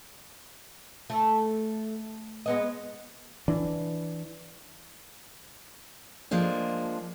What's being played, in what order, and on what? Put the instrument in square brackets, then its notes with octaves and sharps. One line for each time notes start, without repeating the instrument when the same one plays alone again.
[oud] A3
G#3 B3 D#5
[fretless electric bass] E3 D4
[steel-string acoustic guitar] F3 G#3 A#3 D4